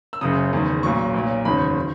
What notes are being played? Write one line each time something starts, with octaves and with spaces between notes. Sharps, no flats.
E6
F#1 F#2 C#3 D#6
F#1 E2 D#3
B1 A#2 F#3 C#6
B1 A#2 F#3
F#1 E2 D#3 F#3 B5
D#3